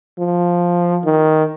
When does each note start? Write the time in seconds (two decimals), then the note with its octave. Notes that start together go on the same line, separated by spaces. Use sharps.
0.19 F3
1.05 D#3